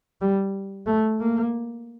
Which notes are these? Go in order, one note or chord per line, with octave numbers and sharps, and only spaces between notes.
G3
A3
A#3